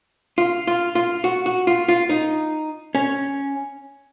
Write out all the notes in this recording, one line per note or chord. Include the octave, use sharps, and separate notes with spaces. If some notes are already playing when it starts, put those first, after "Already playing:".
F4
F4
F4
F#4
F#4
F4
F4
D#4
C#4